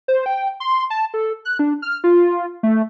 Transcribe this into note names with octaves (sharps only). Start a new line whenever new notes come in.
C5
G5
C6
A5
A4
F#6
D4
F6
F4
A3